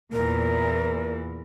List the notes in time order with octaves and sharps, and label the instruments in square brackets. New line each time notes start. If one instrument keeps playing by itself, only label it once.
[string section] E2 A#2 E3 [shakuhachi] A#4